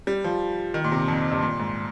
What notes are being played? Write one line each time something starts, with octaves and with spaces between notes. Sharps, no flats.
G3
F3
D#3
A#2
C3
F2
G2
A#2
G#2